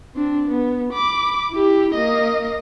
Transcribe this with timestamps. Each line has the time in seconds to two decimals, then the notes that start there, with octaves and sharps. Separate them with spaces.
0.15 C4 D4
0.48 B3
0.93 B5 D6
1.51 E4 G4
1.94 A#3 D#5